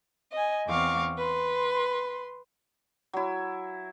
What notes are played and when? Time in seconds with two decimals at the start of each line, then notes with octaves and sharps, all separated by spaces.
0.32 D#5 G#5
0.67 E2 C4 F5 C#6 D6
1.17 B4 C6
3.13 F#3 E4